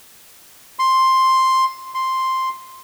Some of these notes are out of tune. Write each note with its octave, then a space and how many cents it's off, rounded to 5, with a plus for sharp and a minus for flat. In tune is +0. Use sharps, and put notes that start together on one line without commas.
C6 +5
C6 +0